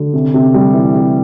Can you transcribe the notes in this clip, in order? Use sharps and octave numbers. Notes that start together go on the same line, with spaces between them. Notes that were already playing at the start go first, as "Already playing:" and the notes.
Already playing: D3
C3
C3
G3
E3
C3